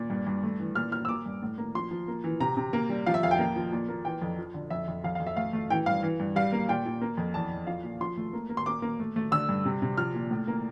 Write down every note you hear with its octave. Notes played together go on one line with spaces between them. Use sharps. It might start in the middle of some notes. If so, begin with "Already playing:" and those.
Already playing: A#2
G2
G2
A3
E3
A#2 F6
A#2 F6
E6
A#3 D6
G2
A2
A#3
F3 C6
F3
A#3
E3
C3 A#5
C3
A#3
G3
F3 F5
E5
F2 F5
G5
A#3
F3
A#2
A#3
E3 G5
F2
F3
D3
F2 E5
F2
F2 F5
F5
F2
E5
A3 F5
A3
E3 G5
G2 F5
E3
G2
G3 F5
A#3
A#2 G5
A#2
A#3
F2
E2 A5
E2
F3 F5
A#2
F3 C6
A3
A#3
A#3
C6
A#3 D6
A#3
A3
A3
D3 E6
G2
C3
C3
F3 F6
A#2
A2
A#3